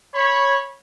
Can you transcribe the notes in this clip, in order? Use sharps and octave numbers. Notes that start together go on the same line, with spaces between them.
C#5 B5